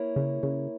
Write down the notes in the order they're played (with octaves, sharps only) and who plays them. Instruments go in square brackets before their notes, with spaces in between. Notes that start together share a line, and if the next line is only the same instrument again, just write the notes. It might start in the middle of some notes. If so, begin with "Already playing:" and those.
Already playing: [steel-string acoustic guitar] A#3 E4 A#4 C#5
[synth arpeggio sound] C#3
C#3